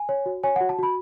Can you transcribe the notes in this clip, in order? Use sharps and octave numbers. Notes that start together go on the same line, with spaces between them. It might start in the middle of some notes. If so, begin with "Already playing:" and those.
Already playing: G#5
C#5
F#4
C#5 G#5
F#5
F#4
A5
F#4 B5